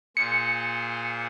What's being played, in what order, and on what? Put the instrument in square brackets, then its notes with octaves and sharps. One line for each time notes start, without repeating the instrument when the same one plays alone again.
[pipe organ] A#2 G#4 C5 [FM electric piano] C#7